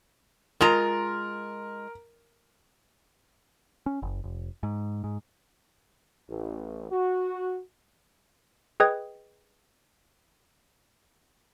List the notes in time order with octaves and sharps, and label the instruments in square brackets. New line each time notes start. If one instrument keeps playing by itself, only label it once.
[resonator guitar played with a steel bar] G#3 F4 A#5 [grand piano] A#4
[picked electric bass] C#4
F#1
F1
G#2
G#2
[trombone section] A1
F#4
[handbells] G#4 B4 D#5 G5 D#6 G#6